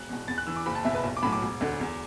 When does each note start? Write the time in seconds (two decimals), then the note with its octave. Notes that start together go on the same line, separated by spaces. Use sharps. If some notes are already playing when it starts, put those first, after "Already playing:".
Already playing: E1 F#6
0.09 E2 B2
0.28 E2 A6
0.38 F#6
0.47 E3 E6
0.56 D6
0.66 F#1 B5
0.75 A5
0.85 E2 B2 E5
0.94 B4
1.04 B1
1.17 D6
1.23 A2 F#3 B5
1.32 D6
1.42 E1
1.61 D2 D3
1.80 E2